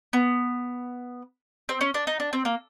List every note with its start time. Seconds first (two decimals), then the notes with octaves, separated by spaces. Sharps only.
0.13 B3
1.69 C4
1.81 C#4
1.94 D4
2.07 D#4
2.20 D4
2.33 C4
2.45 A#3